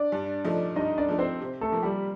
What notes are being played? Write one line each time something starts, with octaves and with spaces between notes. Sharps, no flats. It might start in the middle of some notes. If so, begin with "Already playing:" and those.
Already playing: D4 D5
G2
F3 A3 D#4
G2 D#4 D#5
D4 D5
F3 A3 D#4
C4 C5
C3
A3 A4
F3 A#3
G3 G4